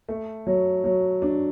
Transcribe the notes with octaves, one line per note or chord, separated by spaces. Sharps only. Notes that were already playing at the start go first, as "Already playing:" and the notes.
A3
F#3
F#3
D4